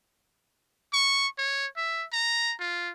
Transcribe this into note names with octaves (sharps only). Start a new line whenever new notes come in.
C#6
C#5
E5
A#5
F4